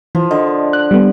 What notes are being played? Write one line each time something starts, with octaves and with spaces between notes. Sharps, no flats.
E3 F3
D3 D#5
F#6
G3 A3 B3